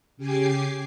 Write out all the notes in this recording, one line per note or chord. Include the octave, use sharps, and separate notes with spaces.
C#3 G4 G#5 D6 C7